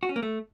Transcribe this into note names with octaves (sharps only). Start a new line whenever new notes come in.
F#4
C#4
A#3
A3